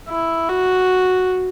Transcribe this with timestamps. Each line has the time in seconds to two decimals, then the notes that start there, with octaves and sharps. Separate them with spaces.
0.09 E4
0.49 F#4